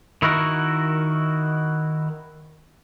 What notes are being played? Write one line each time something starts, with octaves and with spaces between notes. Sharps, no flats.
D#3 E4 F#4 A#4